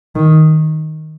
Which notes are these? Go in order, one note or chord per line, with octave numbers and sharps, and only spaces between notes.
D#3